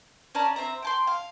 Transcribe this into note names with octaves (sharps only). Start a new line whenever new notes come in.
C#4 D5 A5 A#5
C4 E5 A#5
G5 A5 C6
F5